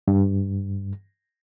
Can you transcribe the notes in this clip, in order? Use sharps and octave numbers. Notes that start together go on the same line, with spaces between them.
G2